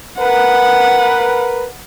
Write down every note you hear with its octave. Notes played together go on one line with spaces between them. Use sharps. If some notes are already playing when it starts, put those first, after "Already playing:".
A#4 B4 F#5